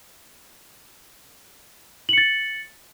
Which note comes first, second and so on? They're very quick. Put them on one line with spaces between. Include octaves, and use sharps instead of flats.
F#7 C#7 A6